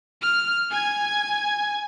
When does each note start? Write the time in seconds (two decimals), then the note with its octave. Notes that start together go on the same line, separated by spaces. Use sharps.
0.22 F6
0.71 G#5 G#6